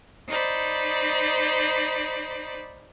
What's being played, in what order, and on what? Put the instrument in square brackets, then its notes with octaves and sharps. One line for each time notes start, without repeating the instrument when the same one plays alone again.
[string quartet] D#4 C5 D5 B5